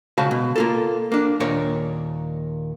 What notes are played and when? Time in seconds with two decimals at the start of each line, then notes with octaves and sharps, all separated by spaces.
0.18 C#3 G#3 F#4 F5 A5 B5
0.31 B2
0.56 A#3 F4 A4
1.12 A#3 D4
1.40 D#2 A#2 A#4 C#5 D5